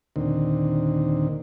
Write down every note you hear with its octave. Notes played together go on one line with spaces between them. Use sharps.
D#2 A#2 D3 D#3 C4